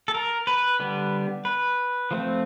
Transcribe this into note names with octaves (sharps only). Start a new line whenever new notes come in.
A4
A#4
B4
D3 G3 B3
B4
F3 A3 C4